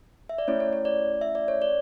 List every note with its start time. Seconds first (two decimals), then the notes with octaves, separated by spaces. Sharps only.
0.29 E5
0.38 D5
0.48 A3 C#4 E4 C#5
0.60 C#5
0.73 C#5
0.85 D5
1.21 E5
1.35 D5
1.48 C#5
1.62 D5